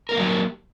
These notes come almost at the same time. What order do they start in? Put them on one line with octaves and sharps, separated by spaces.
A#4 B3 A#3 F#3 G4